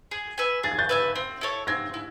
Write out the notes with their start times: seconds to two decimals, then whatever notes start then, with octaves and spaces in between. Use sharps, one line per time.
0.11 G#4
0.38 B4 E5 G#5
0.63 G#4 A6
0.72 G#6
0.79 G6 A6
0.89 B4 E5 G#5
1.16 C4
1.41 E4 A4 C#5
1.67 C4 G#6 A#6
1.94 E4